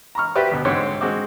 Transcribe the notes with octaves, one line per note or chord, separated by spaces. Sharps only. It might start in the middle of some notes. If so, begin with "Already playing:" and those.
A#5 B5 C#6 F6
F#4 G4 B4 C5 D5 E5
D2 B2
G#2 D3 C4 C#5 D6
G#3 C4 F#4 D6